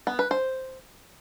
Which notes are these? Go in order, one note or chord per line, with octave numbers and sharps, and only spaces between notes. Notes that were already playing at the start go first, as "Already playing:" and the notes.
B3
B4
C5